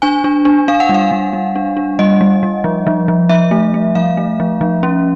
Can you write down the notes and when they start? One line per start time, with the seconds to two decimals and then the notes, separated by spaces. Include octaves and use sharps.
0.02 D4 G#5
0.24 D4
0.45 D4
0.68 D4 F5
0.80 F#5
0.89 G3
0.94 F5
1.11 G3
1.33 G3
1.56 D4
1.77 D4
1.99 G3 D#5
2.21 G3
2.43 G3
2.64 F3
2.87 F3
3.08 F3
3.29 F3 E5
3.51 A3
3.74 A3
3.95 F3 F5
4.17 A3
4.40 F3
4.61 F3
4.83 C#4